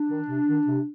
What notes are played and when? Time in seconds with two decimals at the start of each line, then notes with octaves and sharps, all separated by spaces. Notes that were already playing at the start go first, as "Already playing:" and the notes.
Already playing: D4
0.10 D#3
0.29 C3
0.48 D#3
0.68 C3